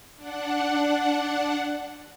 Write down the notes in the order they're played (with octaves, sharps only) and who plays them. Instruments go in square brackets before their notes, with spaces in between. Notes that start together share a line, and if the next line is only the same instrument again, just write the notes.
[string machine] D4 F#5